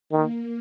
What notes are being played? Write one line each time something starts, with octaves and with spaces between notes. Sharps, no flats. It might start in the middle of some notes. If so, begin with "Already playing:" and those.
D#3 A#3